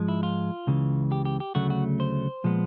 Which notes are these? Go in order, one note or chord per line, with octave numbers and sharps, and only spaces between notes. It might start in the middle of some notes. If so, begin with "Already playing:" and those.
Already playing: G#2 F3 G#3
E4
F4
C#2 C#3 E3
G4
G4
G4
D2 C#3 F#3 A3 F#4
F#4
C5
A#2 F3 G#3 B3